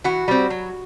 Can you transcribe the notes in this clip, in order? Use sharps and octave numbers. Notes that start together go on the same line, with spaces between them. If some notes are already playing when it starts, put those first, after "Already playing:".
E3 F#4
G3 C4
F#3